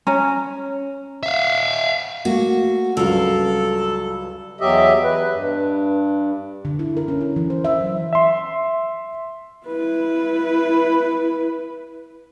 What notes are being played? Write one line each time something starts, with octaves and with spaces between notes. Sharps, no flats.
C#4 A#5
E5 F5
A3 A#3 F#4
C#2 G2 F#3 A4 A#4 F5
E2 F#3 G4 D#5 E5
B4
G2
D3
E4
A#4
C#4
E4
E3
C5
E5
F#3
E5 C6
E4 B4